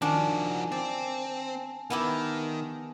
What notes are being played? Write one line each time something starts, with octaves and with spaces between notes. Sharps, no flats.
D#3 F3 D4 F#4 G#5 A5
C4 D5
D#3 B3 E4 G4